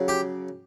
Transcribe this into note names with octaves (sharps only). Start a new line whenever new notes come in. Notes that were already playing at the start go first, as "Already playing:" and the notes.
Already playing: C#3 F#3
G4